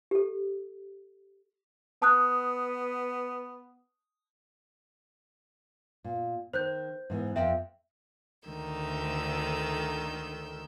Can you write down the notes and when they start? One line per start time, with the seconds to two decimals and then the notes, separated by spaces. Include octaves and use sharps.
0.11 G4 A4
2.02 B3 A5 D#6 F#6
6.04 A#2
6.53 D#3 C5 F#6 G6
7.10 G#2 E3 B3
7.36 F2 E5 G5
8.48 D2 D3 D#3 E6 G6